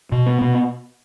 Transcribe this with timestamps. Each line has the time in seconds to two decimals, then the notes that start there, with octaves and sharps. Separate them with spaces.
0.12 B2
0.26 B3
0.41 B2